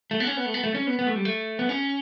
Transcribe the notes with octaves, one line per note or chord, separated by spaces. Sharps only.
A3
B3
C#4
B3
A3
B3
A3
C#4
B3
B3
A3
G3
A3
B3
C#4